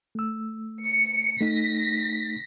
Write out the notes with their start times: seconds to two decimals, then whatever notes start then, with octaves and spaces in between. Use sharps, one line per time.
0.15 A3 E6
0.87 C#7
1.40 A3 D#4 A#6 B6